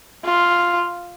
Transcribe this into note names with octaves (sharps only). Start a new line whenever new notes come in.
F4